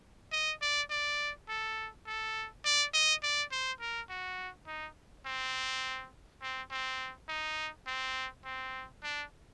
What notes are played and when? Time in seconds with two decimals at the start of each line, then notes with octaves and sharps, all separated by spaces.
0.32 D#5
0.62 D5
0.90 D5
1.49 A4
2.06 A4
2.65 D5
2.94 D#5
3.23 D5
3.52 C5
3.81 A#4
4.09 F#4
4.67 D#4
5.26 C4
6.42 C4
6.71 C4
7.29 D#4
7.87 C4
8.45 C4
9.03 D4